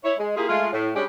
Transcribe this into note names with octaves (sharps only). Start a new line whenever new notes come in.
E4 C#5
G#3
A#3 E4 F4 G4 G#4
G#3 A3 F4
A2
G3 G#3 C#4 D4 G4 G#4